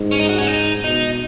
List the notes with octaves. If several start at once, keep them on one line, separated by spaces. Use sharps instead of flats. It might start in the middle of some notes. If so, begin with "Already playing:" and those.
Already playing: G#2
C#4
D#4
F#4
C#4
D#4
B2 D#4